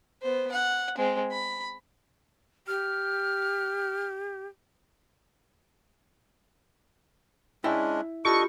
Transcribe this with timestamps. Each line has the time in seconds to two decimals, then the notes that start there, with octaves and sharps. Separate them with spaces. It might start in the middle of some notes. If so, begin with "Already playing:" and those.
0.22 B3 C5
0.51 F#5
0.98 G#3 C4
1.31 B5
2.68 G4 F6
7.64 G#3 C#4 D4 E4 E5 G5
8.25 D4 F4 G4 A4 D#5 B5 C#6